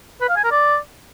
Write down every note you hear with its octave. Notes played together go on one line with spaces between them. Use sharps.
B4
F5
G#5
A#4
D5